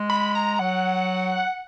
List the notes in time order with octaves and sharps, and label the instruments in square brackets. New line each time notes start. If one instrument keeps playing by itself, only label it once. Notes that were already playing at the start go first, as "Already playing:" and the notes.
Already playing: [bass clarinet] G#3
[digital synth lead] B5
A#5
[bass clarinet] F#3 [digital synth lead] F#5